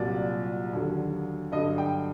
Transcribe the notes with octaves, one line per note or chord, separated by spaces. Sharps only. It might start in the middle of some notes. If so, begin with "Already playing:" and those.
Already playing: C2 A#2 F#3 D5
D#2 D3 F#3
G2 D3 F#3 D#5
G5